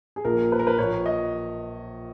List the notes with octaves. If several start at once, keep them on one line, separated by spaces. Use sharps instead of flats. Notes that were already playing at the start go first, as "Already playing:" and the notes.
G#4
A#1 A#2 A#4
B4
A#4
B4
A#1 A#2 C#5
D#5